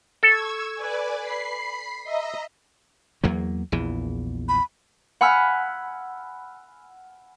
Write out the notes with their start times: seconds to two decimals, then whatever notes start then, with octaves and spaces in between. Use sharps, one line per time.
0.23 A4 C#6 E6 G#6
0.75 B4 D5 G#5
1.19 B5 C7
2.03 D#5 E5 A#5
3.24 E2 F#3 A#3
3.72 A#1 E2 E3
4.49 B5
5.21 F#5 G#5 B5 E6 F6